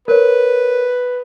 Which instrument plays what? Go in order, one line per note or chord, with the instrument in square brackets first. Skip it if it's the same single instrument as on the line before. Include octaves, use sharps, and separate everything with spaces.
[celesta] A#4 C#5 [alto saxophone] B4